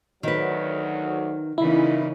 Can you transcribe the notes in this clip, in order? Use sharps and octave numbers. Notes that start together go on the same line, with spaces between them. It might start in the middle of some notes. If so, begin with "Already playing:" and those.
D2 D#3 F#3 B4
A#2 C#3 E3 C#4 D#4 E4